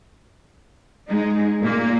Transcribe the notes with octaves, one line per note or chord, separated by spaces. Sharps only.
G#3 D#4
A#2 A#3